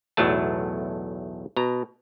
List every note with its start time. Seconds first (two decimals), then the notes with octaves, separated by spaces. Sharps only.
0.17 B1 E2 A2 F#3 A3 A5
1.57 B2 A#5